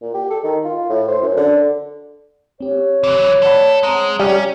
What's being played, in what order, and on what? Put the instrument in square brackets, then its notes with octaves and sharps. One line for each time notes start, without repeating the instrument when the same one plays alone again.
[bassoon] A#2
G4
A4
D#3
F4
A2
C5
F#2
D3
[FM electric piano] C4 G4 [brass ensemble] C#5
[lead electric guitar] E3 F#3
[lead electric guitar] A4 [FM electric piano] D5 F#5 B5
[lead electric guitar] G#3 [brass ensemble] C4 C#5 F#5 [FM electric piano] A#5
[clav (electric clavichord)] G3 [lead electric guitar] C#4 [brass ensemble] G5